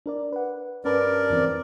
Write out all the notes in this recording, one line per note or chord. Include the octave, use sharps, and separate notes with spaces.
D4 A#4 D5
B4 F#5
G2 C#4 A#4 B4 D5 A5
F2 E3 C4